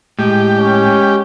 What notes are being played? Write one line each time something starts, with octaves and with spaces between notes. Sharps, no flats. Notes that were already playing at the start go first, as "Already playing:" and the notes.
A2 G#3 G4
C#4